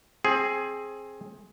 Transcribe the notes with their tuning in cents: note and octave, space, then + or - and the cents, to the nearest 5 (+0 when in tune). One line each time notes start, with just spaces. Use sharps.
C4 +20 G#4 +10